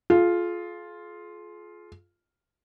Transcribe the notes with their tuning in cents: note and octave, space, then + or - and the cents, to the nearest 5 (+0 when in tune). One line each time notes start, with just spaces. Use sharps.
F4 +0 G#4 +40